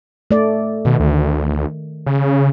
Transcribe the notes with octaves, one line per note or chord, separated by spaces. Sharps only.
A3 D5
B2 D#3
D2
C#3